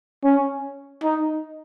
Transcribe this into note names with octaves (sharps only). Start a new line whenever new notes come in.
C#4
D#4